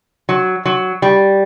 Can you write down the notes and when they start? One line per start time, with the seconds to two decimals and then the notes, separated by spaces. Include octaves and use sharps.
0.29 F#3
0.66 F#3
1.02 G3